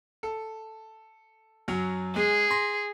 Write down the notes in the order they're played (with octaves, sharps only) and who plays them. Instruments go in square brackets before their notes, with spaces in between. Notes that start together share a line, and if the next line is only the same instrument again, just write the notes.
[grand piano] A4
F#2 F#3
[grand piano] G#3 [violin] G#4
[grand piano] C6 A#6